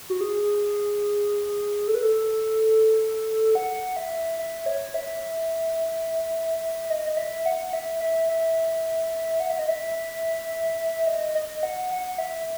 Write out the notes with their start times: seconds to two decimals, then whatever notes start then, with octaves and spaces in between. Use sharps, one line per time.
0.10 F#4
0.21 G#4
1.88 A4
1.95 B4
2.03 A4
3.55 F#5
3.97 E5
4.39 E5
4.66 C#5
4.94 E5
6.90 D#5
7.05 D#5
7.17 E5
7.46 F#5
7.73 E5
8.01 E5
8.29 E5
9.40 F#5
9.50 E5
9.59 D#5
9.68 E5
11.07 D#5
11.35 D#5
11.63 F#5
11.91 F#5
12.18 E5